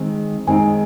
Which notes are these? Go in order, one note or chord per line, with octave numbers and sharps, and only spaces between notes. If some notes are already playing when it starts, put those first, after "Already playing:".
Already playing: D#3 G#3 C4 D#4
D#3 G#3 C4 D#4 G#5